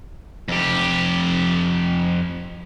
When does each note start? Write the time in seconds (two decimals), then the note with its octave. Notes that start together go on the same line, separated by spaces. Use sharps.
0.48 F2 G4